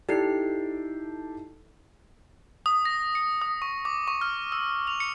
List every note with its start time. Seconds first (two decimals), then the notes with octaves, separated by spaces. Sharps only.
0.09 D#4 E4 G4 A4 D5 C7
2.66 D#6
2.85 A#6
3.15 C#7
3.42 D#6
3.62 C#6
3.85 D6
4.08 C#6
4.21 F6
4.52 E6
4.87 F7
5.00 C#7